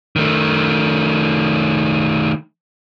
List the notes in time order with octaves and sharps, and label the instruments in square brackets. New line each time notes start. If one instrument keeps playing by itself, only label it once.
[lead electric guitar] D#3 A3